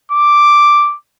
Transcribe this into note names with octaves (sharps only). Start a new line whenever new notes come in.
D6